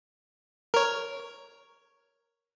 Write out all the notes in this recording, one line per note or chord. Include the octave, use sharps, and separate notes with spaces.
A#4 C#5